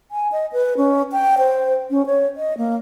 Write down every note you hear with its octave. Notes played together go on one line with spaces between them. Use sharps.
G#5
D#5
B4
C#4
G5
C5
C#4
C#5
D#5
A#3